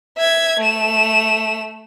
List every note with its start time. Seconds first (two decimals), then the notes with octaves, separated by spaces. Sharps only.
0.18 E5 G#6
0.60 A3 E7